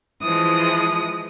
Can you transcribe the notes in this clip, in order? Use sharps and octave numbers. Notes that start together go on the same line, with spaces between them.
E3 F3 G#3 D#6